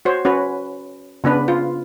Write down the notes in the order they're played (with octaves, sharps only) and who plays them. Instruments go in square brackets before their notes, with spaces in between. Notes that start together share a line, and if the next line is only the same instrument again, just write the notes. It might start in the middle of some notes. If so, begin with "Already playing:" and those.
[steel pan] F#4 C5 C#5
C#4 F#4 B4
C#3 B3 D4 B4
F4